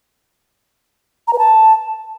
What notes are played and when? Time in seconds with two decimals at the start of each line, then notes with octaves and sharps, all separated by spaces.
1.28 A#5
1.33 B4
1.39 A5